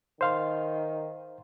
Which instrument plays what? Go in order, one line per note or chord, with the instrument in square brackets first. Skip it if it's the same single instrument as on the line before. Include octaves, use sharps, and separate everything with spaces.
[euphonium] D#3 [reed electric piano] C5 F5 C6